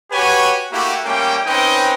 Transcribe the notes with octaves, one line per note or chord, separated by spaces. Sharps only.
F#4 G4 B4 C#5 F#5 G#5
A3 A#3 E4 F#4 G4
G3 A3 A#3 C#4 G5
C4 C#4 D#4 B4 D#5 G5